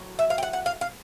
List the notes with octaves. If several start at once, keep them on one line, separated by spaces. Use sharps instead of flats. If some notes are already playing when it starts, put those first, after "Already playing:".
Already playing: A2 F#3
E5
F5
G5
F#5
F#5
F5
F5